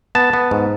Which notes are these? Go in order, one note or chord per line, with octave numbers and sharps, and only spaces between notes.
B3 A5
B3
G#2